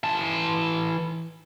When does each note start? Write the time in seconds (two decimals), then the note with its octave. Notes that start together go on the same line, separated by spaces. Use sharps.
0.04 E3 A5